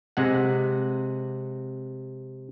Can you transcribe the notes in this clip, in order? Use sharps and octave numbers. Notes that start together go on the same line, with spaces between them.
C3 G#3 F#5